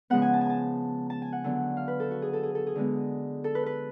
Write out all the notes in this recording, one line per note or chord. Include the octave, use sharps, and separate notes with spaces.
C#3 F3 G#3 B3 F#5
G#5
A5
G#5
A5
A5
G#5
F#5
D3 F#3 B3
F5
B4
A4
F#4
G#4
A4
G#4
A4
G#4
D3 G#3 B3
A4
B4
B4